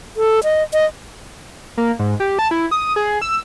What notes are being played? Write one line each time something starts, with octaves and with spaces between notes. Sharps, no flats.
A4
D#5
D#5
A#3
G#2
G4
A5
E4
D#6
G#4
E6